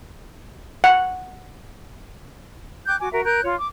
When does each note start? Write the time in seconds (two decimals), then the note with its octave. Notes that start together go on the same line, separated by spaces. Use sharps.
0.84 F#5
2.87 G5 D6 F#6 G6
3.00 F#4 G#5 D6
3.13 F#4 A#4 E5
3.25 A#4 F#6 G6
3.42 F4 C#5
3.58 D6